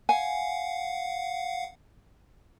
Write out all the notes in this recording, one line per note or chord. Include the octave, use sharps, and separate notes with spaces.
F5 F#5 G#5